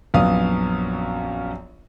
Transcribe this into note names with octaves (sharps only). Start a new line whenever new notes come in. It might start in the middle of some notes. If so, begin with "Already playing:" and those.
A#1 F#2 B3 F5 D#6